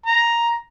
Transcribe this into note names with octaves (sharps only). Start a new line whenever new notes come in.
A#5